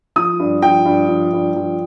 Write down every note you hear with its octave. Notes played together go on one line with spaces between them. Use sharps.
F3 D#6
G2
F3 G5
G2
F3
G2
F3